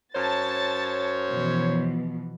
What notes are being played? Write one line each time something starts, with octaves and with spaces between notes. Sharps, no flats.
F#2 C5 C#5 A5 A6
B2 E3 F3